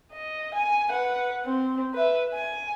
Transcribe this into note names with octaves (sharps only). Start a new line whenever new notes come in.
D#5
G#5
B4 F#5
C4
B4 E5
G#5